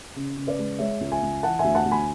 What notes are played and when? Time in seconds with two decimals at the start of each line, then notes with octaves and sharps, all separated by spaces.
0.15 C#3
0.36 C#3
0.47 B4 D5
0.58 G#3
0.79 G#3 C#5 E5
1.01 C#2
1.11 E5 G#5
1.22 C#2
1.43 E3 F#5 A5
1.59 D2 E5 G#5
1.75 F#5 A5
1.85 D2
1.91 G#5 B5